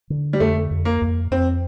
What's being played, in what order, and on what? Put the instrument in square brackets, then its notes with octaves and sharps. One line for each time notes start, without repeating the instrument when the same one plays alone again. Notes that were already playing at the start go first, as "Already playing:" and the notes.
[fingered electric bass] D3
[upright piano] G3
[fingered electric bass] F2 [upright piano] A3
[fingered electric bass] F2
[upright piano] A#3
[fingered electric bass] F2
[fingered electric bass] F2 [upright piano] C4